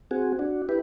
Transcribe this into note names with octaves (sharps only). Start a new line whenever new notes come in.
C4 F#4 G#4
D4 F#4
E4 G4 B4